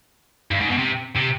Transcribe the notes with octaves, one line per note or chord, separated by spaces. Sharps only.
G2
G#2
B2
C3
C3